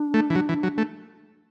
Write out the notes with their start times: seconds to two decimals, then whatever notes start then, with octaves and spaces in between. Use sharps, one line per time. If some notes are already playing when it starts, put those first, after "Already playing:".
Already playing: D4
0.14 A3
0.30 E3
0.35 F#3
0.49 E3
0.63 F#3
0.78 A3